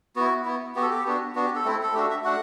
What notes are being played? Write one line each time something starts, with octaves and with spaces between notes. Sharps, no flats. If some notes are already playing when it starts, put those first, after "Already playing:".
B3 E4 F#4
B3 E4
B3 F#4 G4
A4
G4
B3 D4 F#4
B3 D4 F#4
G4
A4
A3 C4 E4
A4
A3 D4 F#4 G4
E5
A3 D4 F#4 F#5